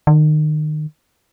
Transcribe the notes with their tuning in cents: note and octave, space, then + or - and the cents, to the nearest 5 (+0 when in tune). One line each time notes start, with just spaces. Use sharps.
D#3 -30